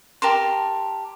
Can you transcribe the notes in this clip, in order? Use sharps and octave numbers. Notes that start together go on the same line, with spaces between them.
G4 A#4 A5 C6